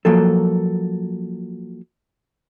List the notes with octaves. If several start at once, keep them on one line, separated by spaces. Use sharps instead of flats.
F3 F#3 A#3 A4